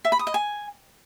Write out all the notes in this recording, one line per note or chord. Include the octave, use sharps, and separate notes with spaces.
E5
B5
D#6
D#5
G#5